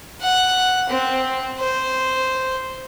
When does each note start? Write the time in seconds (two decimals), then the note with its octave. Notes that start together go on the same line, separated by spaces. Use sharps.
0.22 F#5
0.89 C4
1.59 C5